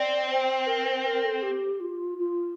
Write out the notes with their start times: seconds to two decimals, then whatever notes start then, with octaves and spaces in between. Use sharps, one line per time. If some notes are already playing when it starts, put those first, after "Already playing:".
Already playing: C4 D5
0.30 C5
0.67 A#4
0.86 C5
1.05 A#4
1.24 A4
1.42 G4
1.80 F4
2.18 F4